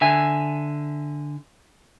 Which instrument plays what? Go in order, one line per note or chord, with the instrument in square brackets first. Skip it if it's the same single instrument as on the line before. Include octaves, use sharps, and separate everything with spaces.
[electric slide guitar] D3 E5 G#5